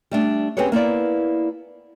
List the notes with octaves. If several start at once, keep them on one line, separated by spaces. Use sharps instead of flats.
G3 A3 D4
C4 C#4 G4 G#4 B4 C#5
A#3 B3 E4 D5